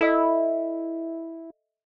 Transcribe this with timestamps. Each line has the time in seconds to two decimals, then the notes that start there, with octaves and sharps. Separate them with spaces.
0.01 E4 A4 D#5 E5